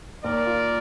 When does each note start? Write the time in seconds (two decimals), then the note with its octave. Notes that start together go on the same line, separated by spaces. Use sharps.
0.23 D#2 A#4 D5
0.46 F4